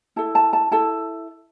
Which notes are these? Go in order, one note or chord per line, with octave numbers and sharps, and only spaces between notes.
E4 A4 A5
A5
A5
E4 A4 A5